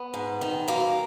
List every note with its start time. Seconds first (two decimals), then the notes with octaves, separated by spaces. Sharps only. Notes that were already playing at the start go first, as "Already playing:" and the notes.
Already playing: B3
0.14 G#2
0.41 D#3
0.68 F#2 A#3